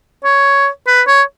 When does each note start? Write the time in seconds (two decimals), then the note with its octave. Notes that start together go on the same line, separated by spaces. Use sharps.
0.25 C#5
0.87 B4
1.07 C#5